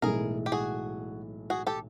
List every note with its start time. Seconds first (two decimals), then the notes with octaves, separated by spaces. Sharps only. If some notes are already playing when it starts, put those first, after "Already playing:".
0.02 B1 A2 E3 G#3 G#4 A#4
0.46 G4
0.52 F#4 G#4
1.50 F#4 G#4
1.67 G4 A4